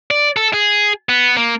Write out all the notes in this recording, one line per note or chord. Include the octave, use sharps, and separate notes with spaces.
D5
A4
G#4
B3
A#3